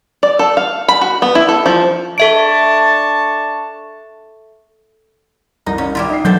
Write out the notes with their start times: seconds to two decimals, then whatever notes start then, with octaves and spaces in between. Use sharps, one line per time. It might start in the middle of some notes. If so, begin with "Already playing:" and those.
0.23 D5
0.39 A4
0.57 F5
0.88 B5
1.01 F#4
1.22 B3
1.35 E4
1.49 A4
1.66 F3
2.18 D4 A4 E5 A5 C#6 D7
5.66 C2 D#4
5.78 C#4
5.95 G3 E4 F4
6.10 D#4 C7
6.25 B2 D3 F#3 A4 G6